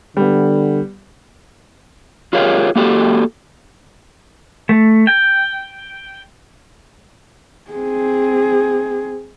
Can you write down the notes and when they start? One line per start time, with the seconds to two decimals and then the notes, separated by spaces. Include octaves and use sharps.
0.17 D3 G3 B3
2.33 F4 G4 G#4 A#4 C#5 F5
2.75 A#3 F#4 G4 A4
4.69 A3
5.07 G5
7.71 C4 G#4